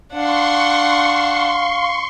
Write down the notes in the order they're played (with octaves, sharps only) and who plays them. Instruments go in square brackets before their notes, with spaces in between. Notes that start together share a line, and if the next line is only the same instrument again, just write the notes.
[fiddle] D4 F#5 [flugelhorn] F5 [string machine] C6 C#6